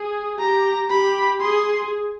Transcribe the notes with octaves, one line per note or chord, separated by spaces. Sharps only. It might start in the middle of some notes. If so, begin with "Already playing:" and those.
Already playing: G#4
G4 A#5
G4 B5
G#4 C6